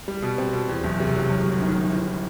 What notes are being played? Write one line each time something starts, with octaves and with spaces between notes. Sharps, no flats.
G3
B2
C4
B2
E2
F#1
C3
F#3
F#2
G1
D#3
G1
E3